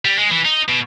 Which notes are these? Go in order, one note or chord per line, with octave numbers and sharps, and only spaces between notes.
G3
G#3
E3
D#4
B2